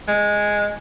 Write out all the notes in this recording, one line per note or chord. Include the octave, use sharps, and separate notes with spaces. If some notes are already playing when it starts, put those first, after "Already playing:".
G#3